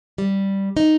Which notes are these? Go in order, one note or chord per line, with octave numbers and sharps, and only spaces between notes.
G3
D#4